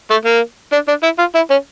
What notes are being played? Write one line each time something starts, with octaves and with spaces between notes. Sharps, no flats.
A3
A#3
D4
D4
E4
F4
E4
C#4